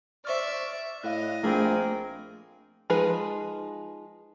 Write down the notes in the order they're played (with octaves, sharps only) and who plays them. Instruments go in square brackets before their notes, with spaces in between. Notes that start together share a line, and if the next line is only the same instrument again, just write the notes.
[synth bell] C5 C#6 F6 [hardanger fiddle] D5 E5
[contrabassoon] A2 [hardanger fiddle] D#5 [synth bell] F5 F#6
[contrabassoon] A#1 [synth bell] A3 [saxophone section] A#3 C4 G#4
[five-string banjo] F3 G#3 D#4 G#4 B4